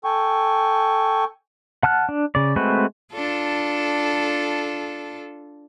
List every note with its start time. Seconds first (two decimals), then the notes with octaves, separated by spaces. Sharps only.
0.04 A4 G5 G#5 C#6
1.83 F#5 A5 F6 F#6
2.09 D4
2.35 C#3 D5
2.56 G#3 A3 C4 F#4 B4
3.13 D4 F4 A4